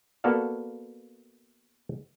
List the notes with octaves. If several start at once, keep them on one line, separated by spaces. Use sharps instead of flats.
A#3 B3 F#4 A4 D5 F5